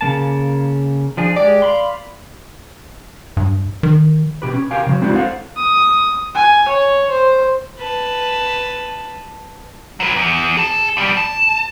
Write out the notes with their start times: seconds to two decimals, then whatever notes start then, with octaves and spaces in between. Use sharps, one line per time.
0.01 C#3 A#3 A5
1.17 F3 D4 G#4
1.36 G#3 G4 D5
1.62 F5 B5 C6
3.37 G2
3.83 D#3
4.42 B2 G4 B4
4.53 C#4
4.71 G4 A#4 F5 G5 G#5
4.86 C#3 F#3
5.02 G#3 C4 D4 E4 F#4 B4
5.15 A4 C5 F5 F#5
5.57 D#6
6.35 G#5
6.68 C#5
7.10 C5
7.80 B4 A5
10.00 F#3 B4
10.16 E2
10.57 G#4 A5
10.97 E2 G3
11.17 A5